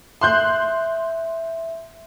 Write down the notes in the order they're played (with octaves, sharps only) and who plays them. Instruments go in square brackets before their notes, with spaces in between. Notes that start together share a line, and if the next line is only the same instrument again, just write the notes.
[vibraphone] E5 [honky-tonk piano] C6 F#6 G6